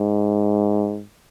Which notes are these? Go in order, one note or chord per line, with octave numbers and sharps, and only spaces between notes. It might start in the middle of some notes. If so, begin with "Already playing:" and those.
Already playing: G#2